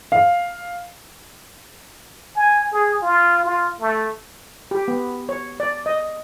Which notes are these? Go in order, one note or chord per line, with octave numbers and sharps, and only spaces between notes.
F5
G#5
G#4
F4
F4
A3
G4
B3
C#5
D5
D#5